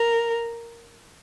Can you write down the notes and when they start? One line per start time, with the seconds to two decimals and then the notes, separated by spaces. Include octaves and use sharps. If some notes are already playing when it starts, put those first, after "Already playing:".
Already playing: A#4